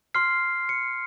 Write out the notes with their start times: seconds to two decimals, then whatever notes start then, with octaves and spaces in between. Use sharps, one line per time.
0.14 C6 F6 C7
0.69 C#7